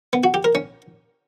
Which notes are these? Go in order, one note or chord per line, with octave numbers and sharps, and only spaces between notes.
B3
F#4
G4
A#4
C#4